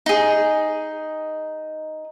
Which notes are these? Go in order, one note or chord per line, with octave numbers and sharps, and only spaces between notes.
D#4 G#4